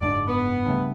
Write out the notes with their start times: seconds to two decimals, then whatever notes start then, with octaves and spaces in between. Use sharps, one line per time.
0.01 F#1 G#2 D4 D5
0.27 B3
0.66 G2 C#3 A3